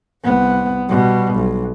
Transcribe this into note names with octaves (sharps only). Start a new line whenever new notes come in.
C2 B3
B2 G3
B1